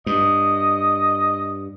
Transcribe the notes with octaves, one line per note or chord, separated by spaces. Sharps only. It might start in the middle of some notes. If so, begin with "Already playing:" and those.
G2 D#5